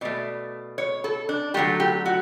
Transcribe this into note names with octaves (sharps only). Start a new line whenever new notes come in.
B2 A3 D5
C#5
A4
D4
D3 F#3 A3 G4
G4
F#4